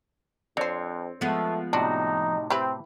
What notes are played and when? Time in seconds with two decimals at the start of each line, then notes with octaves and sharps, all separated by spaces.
0.57 F2 C4 D4 C5 C#5
1.21 F3 G#3 A3 B3
1.73 A2 C3 D4 D#4 F#4
2.50 C4 E4 G4 B4